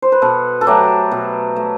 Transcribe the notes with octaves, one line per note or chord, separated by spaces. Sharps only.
C5
B4
B2 A4
A4
F#3 A3 G4
B2
A3